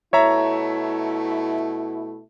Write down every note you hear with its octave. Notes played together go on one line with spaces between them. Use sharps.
B2 A3 E4 C#5 E5 A#5